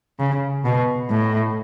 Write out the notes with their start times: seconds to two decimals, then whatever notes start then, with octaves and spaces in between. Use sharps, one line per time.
0.19 C#3
0.65 B2
1.10 A2